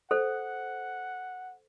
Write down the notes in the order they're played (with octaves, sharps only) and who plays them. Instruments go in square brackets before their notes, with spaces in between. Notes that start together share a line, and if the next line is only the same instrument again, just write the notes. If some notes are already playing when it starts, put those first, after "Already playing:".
[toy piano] A4 C5 [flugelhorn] F#5